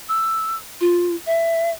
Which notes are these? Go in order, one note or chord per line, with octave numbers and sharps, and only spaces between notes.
E6
F4
E5